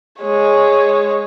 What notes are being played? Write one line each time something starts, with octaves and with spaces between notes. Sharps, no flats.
G#3 C#5